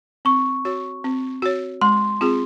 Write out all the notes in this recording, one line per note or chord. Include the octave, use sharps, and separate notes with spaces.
C4 C#6
F#4 C#5
C4
F#4 C#5
G#3 C6
C4 F4 G#4